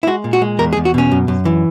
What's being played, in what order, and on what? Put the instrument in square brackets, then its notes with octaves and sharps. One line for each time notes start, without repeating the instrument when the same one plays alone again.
[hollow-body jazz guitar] E4
G#3 F#4
A#2
F#4
G#3
E2 A#4
G#4
E2
F#4
B2 C#4
F#2
F#2
E3